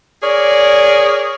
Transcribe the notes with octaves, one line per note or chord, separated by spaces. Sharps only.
G#4 A#4 C#5 D5